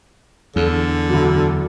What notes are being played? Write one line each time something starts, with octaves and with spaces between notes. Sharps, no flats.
E2 D3
D2 F#3